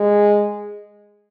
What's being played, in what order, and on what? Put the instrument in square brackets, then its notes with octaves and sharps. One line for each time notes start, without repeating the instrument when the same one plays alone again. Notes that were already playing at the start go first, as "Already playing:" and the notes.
Already playing: [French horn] G#3